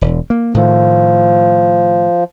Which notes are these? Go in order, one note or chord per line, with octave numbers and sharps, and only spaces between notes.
E1
A#3
A2 D#3 F3 A3